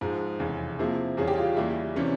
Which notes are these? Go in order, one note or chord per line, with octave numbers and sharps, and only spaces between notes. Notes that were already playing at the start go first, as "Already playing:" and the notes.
G#2 F3 G#3
F1 E2 C#3
C3 F3 A#3 E4 G#4
E2 C#3 G3 C#4 G#4
G4
F4
E2 C#3 G3 A#3 E4
C3 E3 G3 C#4